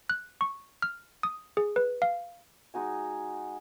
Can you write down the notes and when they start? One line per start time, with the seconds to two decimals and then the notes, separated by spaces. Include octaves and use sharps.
0.10 F#6
0.41 C#6
0.82 F6
1.23 D#6
1.57 G#4
1.76 B4
2.02 F5
2.74 G#3 D#4 F#4 G#5